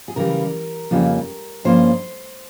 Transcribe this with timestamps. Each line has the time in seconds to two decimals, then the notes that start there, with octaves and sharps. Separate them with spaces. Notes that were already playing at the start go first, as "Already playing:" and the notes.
0.08 G#4
0.16 C#3 E3 G3 A#4
0.91 F2 C#3 G3 A#3 C#4
1.64 G2 F3 A#3 C#4 C5